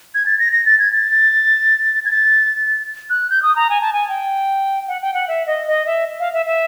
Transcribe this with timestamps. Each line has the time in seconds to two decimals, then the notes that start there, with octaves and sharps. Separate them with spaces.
0.15 G#6
0.26 A6
0.39 A#6
0.53 A#6
0.66 A6
0.79 G#6
0.93 A6
2.06 G#6
2.11 A6
3.10 F#6
3.30 G6
3.42 D#6
3.56 A#5
3.70 G#5
3.81 A5
3.93 G#5
4.08 G5
4.88 F#5
5.02 G5
5.14 F#5
5.28 E5
5.47 D#5
5.68 D#5
5.86 E5
6.20 F5
6.33 E5
6.46 E5